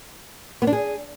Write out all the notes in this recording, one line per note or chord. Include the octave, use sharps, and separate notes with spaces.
B3
D4
G#4